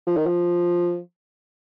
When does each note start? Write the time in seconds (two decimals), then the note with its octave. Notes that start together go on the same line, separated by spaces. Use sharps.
0.07 F3
0.17 D#3
0.27 F3